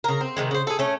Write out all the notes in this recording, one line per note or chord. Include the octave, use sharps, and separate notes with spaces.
C#3 A#4
C4
C3 D#3 G#3
C#3 C5
G#4 A4
A3 C#4